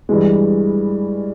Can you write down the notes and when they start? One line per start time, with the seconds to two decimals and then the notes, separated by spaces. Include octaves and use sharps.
0.09 G2 E3 G#3